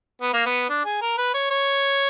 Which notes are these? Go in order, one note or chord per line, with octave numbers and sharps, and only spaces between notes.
B3
A#3
B3
D4
G#4
A#4
B4
C#5
C#5